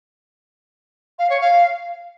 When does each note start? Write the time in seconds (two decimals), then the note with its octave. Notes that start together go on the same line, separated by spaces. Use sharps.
1.19 F5
1.30 C#5
1.41 F5